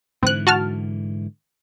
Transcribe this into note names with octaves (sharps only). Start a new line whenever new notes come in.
G#2 D3 E3 C4 F#6
F#4 A5 F6